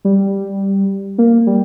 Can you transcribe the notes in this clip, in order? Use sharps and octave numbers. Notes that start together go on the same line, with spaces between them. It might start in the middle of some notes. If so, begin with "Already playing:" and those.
G3
A#3
G3